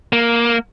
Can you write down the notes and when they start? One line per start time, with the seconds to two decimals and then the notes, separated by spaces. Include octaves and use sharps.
0.13 A#3